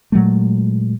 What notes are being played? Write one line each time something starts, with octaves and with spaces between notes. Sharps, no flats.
A#2 F#3 G#3 A3